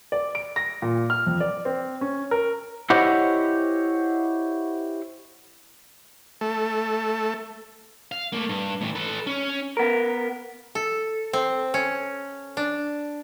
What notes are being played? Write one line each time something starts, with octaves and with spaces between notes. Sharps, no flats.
D5
D7
A#6
A#2
F6
F2
D5
C4
C#4
A#4
E4 G4 C5 C#5 D#5 F#5
A3
F5
A3 A#3
G2
A2 E3
A4 B4
C#4
B3 A#4
A4
C4
C#4
D4